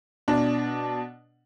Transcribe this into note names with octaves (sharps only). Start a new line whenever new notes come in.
B2 D4